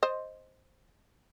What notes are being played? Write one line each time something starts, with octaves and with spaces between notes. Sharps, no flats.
C5 D#5